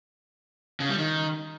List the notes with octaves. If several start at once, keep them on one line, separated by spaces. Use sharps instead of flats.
C#3
G3
D#3